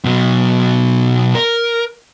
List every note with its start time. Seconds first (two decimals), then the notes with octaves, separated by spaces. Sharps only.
0.05 B2 F#3
1.35 A#4